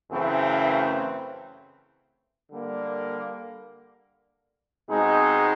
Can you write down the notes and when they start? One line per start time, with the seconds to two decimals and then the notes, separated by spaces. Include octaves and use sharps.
0.11 F#2 C#3 E3 A3 C4
2.50 D3 G3 A#3
4.89 B2 G#3 C4 D#4 G#4